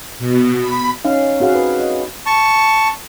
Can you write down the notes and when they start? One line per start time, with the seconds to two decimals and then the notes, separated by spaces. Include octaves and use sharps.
0.18 B2
0.56 B5
1.05 C#4 D#4 F5
1.40 C4 F#4 G#4 F5 F#5
1.53 F#4 B4
1.80 D#5
2.26 A5 C#6